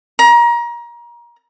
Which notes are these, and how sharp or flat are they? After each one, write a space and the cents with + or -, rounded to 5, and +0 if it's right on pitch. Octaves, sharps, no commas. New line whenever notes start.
A#5 +30